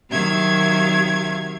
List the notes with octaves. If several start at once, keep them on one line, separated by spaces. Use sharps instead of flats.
C3 D#3 F#3 E5 F5 G#6